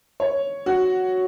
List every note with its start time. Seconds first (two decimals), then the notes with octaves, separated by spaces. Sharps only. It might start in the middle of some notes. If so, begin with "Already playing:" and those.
0.20 C#5
0.66 F#4